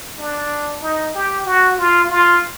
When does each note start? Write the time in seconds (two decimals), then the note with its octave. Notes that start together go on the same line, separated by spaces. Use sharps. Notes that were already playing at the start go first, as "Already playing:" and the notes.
0.19 D4
0.82 D#4
1.15 G4
1.46 F#4
1.78 F4
2.10 F4